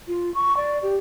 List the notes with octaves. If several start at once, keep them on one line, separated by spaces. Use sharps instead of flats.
F4
C#6
D5
G4